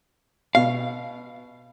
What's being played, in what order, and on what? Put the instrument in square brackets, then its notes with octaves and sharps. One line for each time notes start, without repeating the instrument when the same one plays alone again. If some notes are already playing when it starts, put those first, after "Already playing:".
[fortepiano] B2 [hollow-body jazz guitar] F5